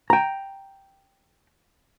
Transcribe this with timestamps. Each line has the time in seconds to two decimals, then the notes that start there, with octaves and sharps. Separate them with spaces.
0.10 G5 A#5